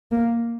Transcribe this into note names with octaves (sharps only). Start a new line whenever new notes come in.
A#3